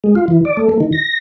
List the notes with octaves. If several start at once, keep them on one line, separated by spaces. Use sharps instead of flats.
G#3
F4
E3
D5
A3
A3
D#3
A#6